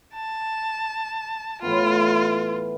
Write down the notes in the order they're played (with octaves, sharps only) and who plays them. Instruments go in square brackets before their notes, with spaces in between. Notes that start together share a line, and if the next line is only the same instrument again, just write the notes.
[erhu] A5
[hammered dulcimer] A2 E3 B3 [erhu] F4